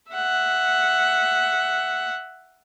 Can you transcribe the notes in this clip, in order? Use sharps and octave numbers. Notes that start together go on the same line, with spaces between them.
E5 F#5